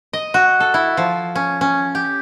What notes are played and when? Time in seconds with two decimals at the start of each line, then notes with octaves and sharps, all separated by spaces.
0.13 D#5
0.34 F#4
0.60 A4
0.74 E4
0.97 F3
1.35 C#4
1.61 C#4
1.95 G4